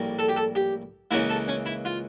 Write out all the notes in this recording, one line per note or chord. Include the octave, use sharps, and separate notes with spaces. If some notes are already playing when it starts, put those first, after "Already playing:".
Already playing: A#1 A2 G3 A#3
A4
G4
A4
G4
C#2 C#3 E3 A#3 E4
A4
C#4
E4
F4